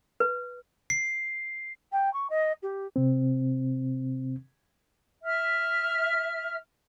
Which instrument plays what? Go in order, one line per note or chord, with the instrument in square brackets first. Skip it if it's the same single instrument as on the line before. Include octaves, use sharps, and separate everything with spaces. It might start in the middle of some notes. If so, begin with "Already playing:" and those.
[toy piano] B4
[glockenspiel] C7
[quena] G5
C#6
D#5
G4
[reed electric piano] C3 C4
[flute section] E5 F6